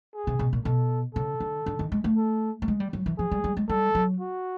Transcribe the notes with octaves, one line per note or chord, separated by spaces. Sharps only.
G#4
C3
B2
A#2
B2 A4
C#3 A4
D3
D3
D#3
G#3
A3
A4
A3
G#3
G3
F#3
E3
F3 G#4
G3
G3
G#3
G3 A4
F#3
F#4